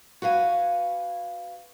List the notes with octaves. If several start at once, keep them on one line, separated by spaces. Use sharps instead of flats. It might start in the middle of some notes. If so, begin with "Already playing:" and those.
F#4 B4 F5 G#5